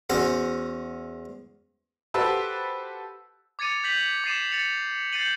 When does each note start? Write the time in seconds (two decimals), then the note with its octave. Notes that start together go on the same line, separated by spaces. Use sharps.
0.10 E2 C#4 F#4 C5
2.14 F#4 G4 A4 B4 C5 E6
3.59 D6 G#6 A6 C#7 D#7 F7
3.84 G6 G#6 B6 F7 F#7
4.24 D6 A6 C7 D#7 E7
4.51 A6 C#7 F7
5.13 G6 A6 C7 C#7 D#7 F#7